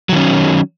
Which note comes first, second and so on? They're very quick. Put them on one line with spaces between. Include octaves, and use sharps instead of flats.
F#3 D#3 C#4